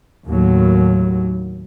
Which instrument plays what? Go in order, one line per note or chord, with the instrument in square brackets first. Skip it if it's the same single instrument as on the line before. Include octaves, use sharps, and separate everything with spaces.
[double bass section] D#2 A2 F#3